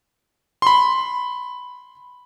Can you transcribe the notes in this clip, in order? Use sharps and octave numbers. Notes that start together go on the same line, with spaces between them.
B5 C6